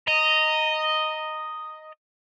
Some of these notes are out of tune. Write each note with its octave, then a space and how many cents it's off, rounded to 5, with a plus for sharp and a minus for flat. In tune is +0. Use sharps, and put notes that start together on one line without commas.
D#5 +0 A#5 -15